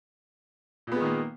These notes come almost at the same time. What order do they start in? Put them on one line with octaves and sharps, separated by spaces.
A#2 B3 G#3 D#3 A#3